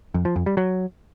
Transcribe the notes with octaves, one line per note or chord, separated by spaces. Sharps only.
F2
F3
F2
G3
F#3